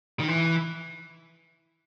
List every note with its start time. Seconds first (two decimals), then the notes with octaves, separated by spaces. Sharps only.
0.20 D#3
0.28 E3